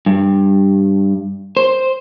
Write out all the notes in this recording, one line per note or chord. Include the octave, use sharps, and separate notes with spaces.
G2
C5